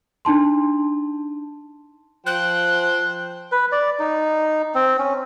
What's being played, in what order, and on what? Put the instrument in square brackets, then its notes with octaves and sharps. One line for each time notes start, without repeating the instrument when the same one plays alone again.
[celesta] D4 D#4 A5 C6
[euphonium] F3 [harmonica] C5 G5 [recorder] F#6
[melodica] B4
D5
D#4
C4
C#4